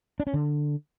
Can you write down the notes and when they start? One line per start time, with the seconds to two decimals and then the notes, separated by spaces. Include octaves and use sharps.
0.20 D4
0.27 C#4
0.34 D3